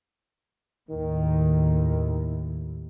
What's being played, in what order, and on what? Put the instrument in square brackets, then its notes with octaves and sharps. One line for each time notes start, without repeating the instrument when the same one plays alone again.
[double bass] D#2 A2 [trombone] D#3